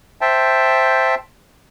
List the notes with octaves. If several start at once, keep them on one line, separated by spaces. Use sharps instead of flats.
C5 E5 G5 A5